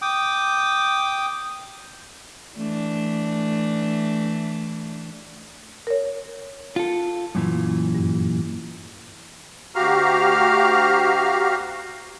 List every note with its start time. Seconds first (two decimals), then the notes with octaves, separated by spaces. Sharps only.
0.02 G5 D6 D#6
2.56 E3 A3 D4
5.87 A#4 C#5
6.76 F4 A4
7.35 F#2 A#2 E3
7.94 G2
9.75 D2 F#4 G4 F5 A#5 F6